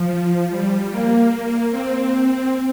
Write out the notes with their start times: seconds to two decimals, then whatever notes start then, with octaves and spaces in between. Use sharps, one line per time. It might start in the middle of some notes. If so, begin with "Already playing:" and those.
Already playing: F3
0.49 G3
0.90 A#3
1.71 C4
2.12 C4